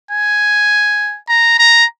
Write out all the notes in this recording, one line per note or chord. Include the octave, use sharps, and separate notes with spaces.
G#5
A#5
A#5